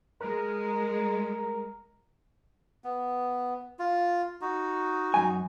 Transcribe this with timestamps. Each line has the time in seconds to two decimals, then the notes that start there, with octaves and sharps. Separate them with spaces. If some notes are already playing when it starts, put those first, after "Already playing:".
0.21 G#3 A#4
2.84 B3
3.79 F4
4.41 D#4 F#4
5.14 F#2 G#5